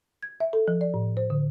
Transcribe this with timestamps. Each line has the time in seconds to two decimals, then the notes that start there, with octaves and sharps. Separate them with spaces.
0.23 G#6
0.40 E5
0.53 A4
0.68 F3
0.81 D5
0.94 A2
1.17 C5
1.30 D3